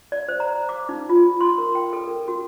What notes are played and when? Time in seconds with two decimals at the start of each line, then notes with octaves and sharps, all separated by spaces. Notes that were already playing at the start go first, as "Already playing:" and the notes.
0.12 D5
0.29 C5
0.40 A#5
0.69 D6
0.89 D#4
1.09 F4
1.41 C6
1.58 A#4
1.75 G5
1.93 A4
2.07 A#4
2.28 F#4